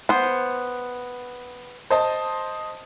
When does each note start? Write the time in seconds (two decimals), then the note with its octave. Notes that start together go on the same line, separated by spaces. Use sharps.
0.09 B3 C5
1.91 C5 D#5 A5